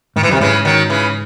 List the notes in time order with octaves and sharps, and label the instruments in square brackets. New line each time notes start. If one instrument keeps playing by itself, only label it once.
[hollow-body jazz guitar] G#2 [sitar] D#3
[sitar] E3
[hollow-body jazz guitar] F#2 [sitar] C3 D#3
[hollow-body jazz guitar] G#2 [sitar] C#3 E3
[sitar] D#3 F#3
C#3 E3